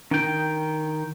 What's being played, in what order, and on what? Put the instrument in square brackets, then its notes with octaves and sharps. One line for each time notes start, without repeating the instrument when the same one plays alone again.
[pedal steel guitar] D#3 G5 [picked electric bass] D4